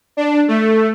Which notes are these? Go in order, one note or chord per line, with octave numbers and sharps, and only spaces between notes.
D4
A3